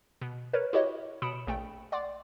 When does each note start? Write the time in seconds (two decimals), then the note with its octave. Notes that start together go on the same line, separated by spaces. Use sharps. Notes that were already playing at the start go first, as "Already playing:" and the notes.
0.21 B2
0.53 A#4 B4 C#5
0.73 E4 F#4 G4 C#5 D#5
1.22 B2 B5 D#6 C#7 D7 E7
1.47 A#1 A3 G5
1.92 D5 F#5 C6 D6